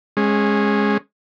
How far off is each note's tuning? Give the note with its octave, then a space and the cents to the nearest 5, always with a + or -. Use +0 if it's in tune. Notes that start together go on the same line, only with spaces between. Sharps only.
G#3 -5 C#4 -25